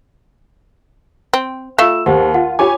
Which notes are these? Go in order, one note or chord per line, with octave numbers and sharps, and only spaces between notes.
C4
A3 F4 F5 E6 E7
D#2 G4 C5 F#5
F4 F#5
F4 G4 C#5 G#5 D6